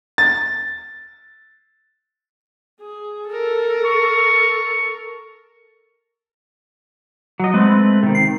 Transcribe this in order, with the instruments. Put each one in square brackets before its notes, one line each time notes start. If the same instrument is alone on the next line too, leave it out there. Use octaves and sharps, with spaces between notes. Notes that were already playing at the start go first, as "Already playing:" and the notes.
[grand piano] A6
[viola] G#4
A4 A#4
[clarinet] C#6
[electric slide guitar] F#3 D#5
[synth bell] G#3 [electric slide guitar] A3 C4 B4
[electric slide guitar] C3 D#3
[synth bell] C7